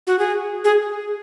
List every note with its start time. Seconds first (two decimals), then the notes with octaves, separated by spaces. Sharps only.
0.07 F#4
0.19 G#4
0.64 G#4